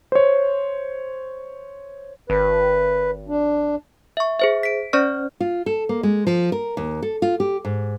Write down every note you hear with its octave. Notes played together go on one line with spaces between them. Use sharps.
C5 C#5
G#1 B4
D4
E5 C#6
G#4 C5 E5
B6 D7
C#4 C5 D5 C#6 F6
F4
A4
A#3
G#3
F3
A#4
D#2
A4
F4
G4
G#2